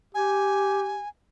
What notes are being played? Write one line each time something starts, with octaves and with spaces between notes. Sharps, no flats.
G4 G#5